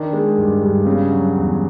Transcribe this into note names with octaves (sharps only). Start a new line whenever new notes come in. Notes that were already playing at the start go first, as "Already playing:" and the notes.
Already playing: D#3 D4
G#3
G2
G2
C#3
F#3
E2